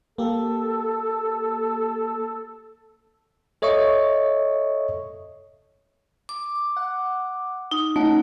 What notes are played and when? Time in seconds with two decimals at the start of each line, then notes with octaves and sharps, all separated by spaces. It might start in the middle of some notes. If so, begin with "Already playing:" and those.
0.18 A#3 G4 A4
3.62 A4 C#5 D#5 E5 C#6
6.29 D6
6.77 F#5
7.71 D#4
7.96 A3 C#4 D#4 F#5